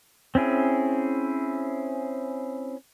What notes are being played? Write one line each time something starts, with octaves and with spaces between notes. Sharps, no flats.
C4 C#4 E4 G#4